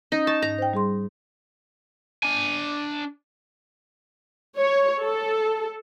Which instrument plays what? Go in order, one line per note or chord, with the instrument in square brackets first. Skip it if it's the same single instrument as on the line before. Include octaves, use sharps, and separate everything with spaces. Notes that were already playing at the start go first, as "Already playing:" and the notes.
[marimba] C#4 [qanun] D#4
[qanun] A5 [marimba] C#6
[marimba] G#2 [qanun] A#5
[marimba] C5 G5
G3 G#4 C6
[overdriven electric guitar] D4 G#5
[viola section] C#5
A4